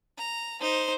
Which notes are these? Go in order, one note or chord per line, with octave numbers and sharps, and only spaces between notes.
A#5
D#4 C5